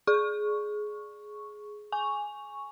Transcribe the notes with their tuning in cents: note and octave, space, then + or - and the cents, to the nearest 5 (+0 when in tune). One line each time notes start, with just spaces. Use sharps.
G#4 +15 C#6 +0
G#5 +0 C#6 +0